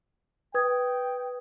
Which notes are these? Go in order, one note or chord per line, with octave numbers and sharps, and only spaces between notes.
B4 G5 D#6 G#6